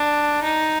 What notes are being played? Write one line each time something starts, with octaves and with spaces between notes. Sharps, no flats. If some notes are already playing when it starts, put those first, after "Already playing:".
Already playing: D4
D#4